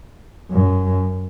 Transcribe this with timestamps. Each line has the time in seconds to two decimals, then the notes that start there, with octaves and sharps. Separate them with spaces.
0.51 F#2